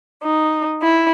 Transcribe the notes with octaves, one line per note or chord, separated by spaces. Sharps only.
D#4
E4